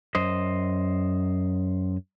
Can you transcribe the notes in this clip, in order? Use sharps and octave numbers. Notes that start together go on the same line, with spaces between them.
F#2 C5 D#5